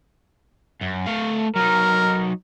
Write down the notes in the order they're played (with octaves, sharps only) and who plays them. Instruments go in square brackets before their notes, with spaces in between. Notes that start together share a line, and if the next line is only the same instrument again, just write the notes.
[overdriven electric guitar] F#2
A3 F5
[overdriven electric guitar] F#3 D#4 [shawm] A#4